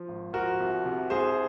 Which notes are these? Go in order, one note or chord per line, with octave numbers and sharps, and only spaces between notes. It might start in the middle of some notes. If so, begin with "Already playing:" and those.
Already playing: F3
G#1
F3 F#4 A#4
C2
C3
C2 G#4 C5